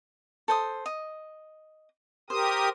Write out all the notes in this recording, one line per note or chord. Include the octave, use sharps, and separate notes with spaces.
A4 C5 D#6
D#5
G4 A#4 C5 D#6